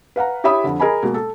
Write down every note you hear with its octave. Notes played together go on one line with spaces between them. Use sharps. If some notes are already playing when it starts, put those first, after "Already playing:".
B4 F5 F#5 A#5
E4 G4 C#5 E5 B5 D#6
F2 D3
G#4 A#4 D#5 G#5 B5
B2 G#3 A#3
A4